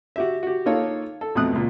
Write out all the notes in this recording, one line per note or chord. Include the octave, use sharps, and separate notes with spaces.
F#4 G4 E5
F#4 G4
A#3 D#4 F4 A4 C#5
A4
B1 F2 A3 D#6 F#6
C#2 A#2